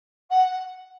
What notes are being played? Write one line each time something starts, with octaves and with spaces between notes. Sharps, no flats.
F#5